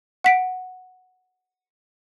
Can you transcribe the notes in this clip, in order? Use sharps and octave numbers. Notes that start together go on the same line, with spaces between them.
F#5 B6 D7